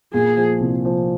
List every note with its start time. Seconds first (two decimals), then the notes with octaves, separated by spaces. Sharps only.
0.13 A#2 G#4
0.37 F3
0.61 C2
0.85 F3